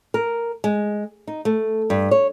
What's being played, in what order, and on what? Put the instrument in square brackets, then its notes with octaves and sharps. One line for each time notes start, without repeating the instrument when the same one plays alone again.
[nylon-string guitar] A#4
G#3
D#4
A3
G2
C#5